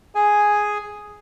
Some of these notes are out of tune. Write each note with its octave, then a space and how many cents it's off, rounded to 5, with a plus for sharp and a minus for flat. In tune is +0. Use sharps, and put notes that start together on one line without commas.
G#4 +0 G#5 +0